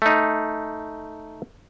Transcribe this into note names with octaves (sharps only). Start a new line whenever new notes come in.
A3 D#4